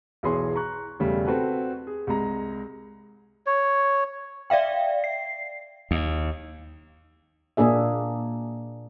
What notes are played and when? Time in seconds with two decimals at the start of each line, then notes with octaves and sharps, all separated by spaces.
0.23 B1 E2 E3 G#4 C#5 C6
0.56 A#5 C#6 F#6
0.99 E1 C#3 G3 A3
1.25 C4 F#4 A4 B4
1.87 G#4
2.07 C2 G#3 A#5
3.46 C#5
4.50 D5 E5 F5 G5
5.04 C7
5.91 D#2
7.57 A#2 A#3 D4 G#4 E5